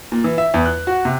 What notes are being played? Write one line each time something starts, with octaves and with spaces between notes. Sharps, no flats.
A#2
E3
E5
E2
F#6
F#4
C3